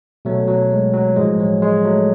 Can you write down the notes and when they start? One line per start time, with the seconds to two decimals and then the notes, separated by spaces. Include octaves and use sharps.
0.25 B2 F#3 A3
0.48 F#3
0.71 G#3
0.93 F#3
1.16 A2 F3 G#3
1.40 F#3
1.62 G#3
1.85 F#3 A3